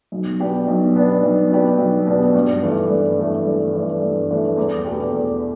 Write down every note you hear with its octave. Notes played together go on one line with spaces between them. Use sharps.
B1
B2 B3 D4 G4
B1
B2 B3 D4 G4
B1
B2 B3 D4 G4
B1
B2 B3 D4 G4
G2
E3 A3 D4
G2
E3 A3 D4
G2
E3 A3 D4
G2
E3 A3 D4
E2
B2 A3 D4 G4
E2